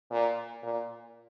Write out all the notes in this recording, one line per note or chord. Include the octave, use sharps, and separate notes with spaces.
A#2
A#2